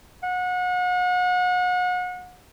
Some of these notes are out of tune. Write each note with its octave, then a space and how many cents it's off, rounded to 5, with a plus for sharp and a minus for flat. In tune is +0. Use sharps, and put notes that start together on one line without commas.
F#5 -35